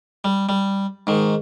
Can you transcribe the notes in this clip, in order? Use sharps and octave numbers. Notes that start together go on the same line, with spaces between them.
G3
G3
G#2 D#3